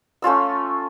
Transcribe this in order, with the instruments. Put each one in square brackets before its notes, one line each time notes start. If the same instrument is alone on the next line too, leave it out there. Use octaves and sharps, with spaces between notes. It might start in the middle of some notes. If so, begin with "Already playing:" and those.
[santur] A3 C#4 F4 E6